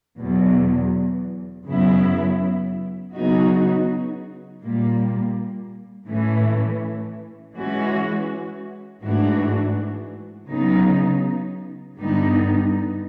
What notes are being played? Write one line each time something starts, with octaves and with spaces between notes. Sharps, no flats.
E2 B2 F#3
F#2 C#3 F#3 B3 E4
C#3 F#3 B3 D#4 F#4
A#2 G3 A#3
A2 E3 A3 C#4
E3 G#3 C#4 F#4
G#2 E3 A3 D4 F#4
C#3 F#3 B3 D#4
G2 D3 G3 B3 D#4